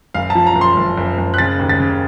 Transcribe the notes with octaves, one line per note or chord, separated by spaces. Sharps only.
F#1 F5
A5
F3
A#5
F#1
C6
F#1
F#1
F#1
F#6
C#3 A6
D#2
A6
C#3